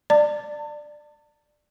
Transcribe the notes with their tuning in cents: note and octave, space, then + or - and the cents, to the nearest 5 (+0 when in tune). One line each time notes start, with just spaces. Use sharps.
D5 +15 A5 +40